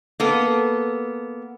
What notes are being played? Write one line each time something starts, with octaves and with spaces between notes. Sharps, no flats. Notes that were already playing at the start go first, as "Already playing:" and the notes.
A#3 B3 A4